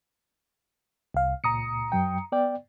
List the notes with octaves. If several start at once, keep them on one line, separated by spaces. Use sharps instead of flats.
C2 F5
C#2 A#2 A#5 D#6 C#7
F#2 F#3 G5
B3 D5 G5